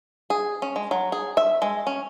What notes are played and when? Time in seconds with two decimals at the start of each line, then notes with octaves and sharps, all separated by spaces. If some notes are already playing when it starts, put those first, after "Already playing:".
0.30 G#4
0.62 C#4
0.76 G#3
0.91 F#3
1.12 G#4
1.37 E5
1.62 G#3
1.87 C#4